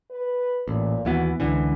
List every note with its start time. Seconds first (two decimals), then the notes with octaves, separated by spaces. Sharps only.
0.10 B4
0.68 A1 A#2
1.05 D#2 E3 B3 F#4
1.40 C#2 D3 E3 E4